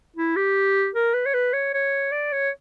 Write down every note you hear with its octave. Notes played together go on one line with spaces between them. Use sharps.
E4
G4
A#4
B4
C#5
B4
C#5
C#5
D5
C#5